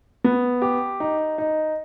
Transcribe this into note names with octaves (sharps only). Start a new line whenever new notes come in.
B3
G4
D#4
D#4